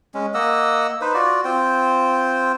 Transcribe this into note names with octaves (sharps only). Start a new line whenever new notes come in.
G#3 C#4
A#3 D#5 F#5 E6
D#4 B4 C5
F4 F#4 D5
C4 F4 C5 G5